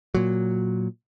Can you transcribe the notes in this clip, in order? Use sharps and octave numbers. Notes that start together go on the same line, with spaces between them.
A#2 F#3